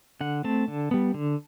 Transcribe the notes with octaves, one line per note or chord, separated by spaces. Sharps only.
D3 F#5
A3 C4 A5
D3
G3 B3
D3